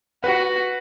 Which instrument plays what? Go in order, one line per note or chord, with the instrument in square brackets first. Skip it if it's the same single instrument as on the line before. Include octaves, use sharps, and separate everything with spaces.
[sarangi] F#4 [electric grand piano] B4